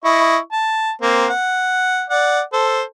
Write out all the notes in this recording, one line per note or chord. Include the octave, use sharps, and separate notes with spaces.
E4 D#5 C#6
A5
A#3 C4
F#5
D5 F#5
A4 C5